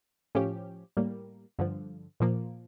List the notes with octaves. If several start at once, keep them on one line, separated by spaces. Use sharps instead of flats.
A2 F3 C#4 G4
A2 G3 A#3
G2 D3 F3
A#2 F3 A#3